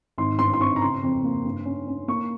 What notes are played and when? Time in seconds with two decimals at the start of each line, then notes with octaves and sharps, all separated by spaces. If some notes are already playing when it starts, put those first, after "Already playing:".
0.18 G#1 C6
0.39 G2 C6
0.53 C6
0.60 C4 C#6
0.76 A#5
0.81 C#3 C6
1.03 F2
1.24 A#3
1.45 G2
1.65 C#4
1.87 C#4
2.08 A#3 C#6